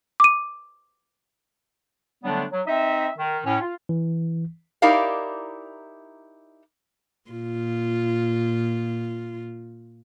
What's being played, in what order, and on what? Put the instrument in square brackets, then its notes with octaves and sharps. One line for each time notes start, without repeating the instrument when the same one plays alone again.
[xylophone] D6 D#7
[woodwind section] D3 F#3 G3 A3 B3 D4
F#3
C4 D#4 D#5 E5
D#3
A2 C#4
F4
[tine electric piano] E3
[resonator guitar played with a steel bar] D#4 E4 G4 A#4 D5 F5
[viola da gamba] A#2 F4